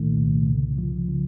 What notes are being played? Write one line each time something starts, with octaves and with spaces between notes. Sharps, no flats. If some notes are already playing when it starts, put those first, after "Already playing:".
Already playing: C2 A#2 D#3 A3
C2
C#3
F3
C#3